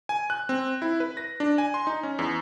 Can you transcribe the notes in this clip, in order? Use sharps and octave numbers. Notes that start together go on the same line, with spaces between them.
G#5
F#6
C4
E4
B4
A#6
D4
G#5
C6
D#4
C#4
E2